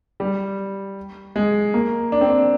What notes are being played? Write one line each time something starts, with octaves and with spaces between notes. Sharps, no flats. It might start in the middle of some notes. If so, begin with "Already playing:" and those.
G3
G#3
A#3
D4
C4
D4